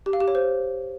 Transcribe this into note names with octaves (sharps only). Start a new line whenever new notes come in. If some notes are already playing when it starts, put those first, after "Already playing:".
G4
F5
G4
C#5
C5